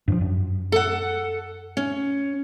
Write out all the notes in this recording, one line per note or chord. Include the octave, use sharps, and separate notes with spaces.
G2 E3 F3
F#2
A4 F#5
C#4